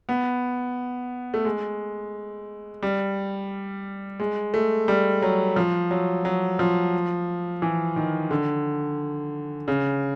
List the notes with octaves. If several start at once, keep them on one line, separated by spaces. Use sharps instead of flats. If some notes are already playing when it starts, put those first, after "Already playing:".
B3
A3
G#3
G3
G#3
A3
G3
F#3
F3
F#3
F#3
F3
E3
D#3
D3
C#3